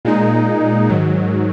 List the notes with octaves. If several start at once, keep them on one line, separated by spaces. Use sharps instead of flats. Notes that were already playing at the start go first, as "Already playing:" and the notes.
A#2 G#3 D#4
G#2 D#3 F#3